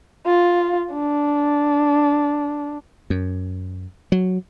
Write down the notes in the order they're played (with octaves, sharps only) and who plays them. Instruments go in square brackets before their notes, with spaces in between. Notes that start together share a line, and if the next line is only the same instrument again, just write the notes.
[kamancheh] F4
D4
[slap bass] F#2
F#3